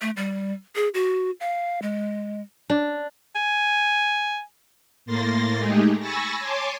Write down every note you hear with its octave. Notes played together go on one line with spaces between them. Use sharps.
A3
G3
G#4
F#4
F5
G#3
D4
G#5
A2 A#3 C6 A6 A#6
G#3 A3 D#4 G4 G#4
G#5 B5 C#6 E6 A6 A#6
C#5 G#5 A5 C6 D6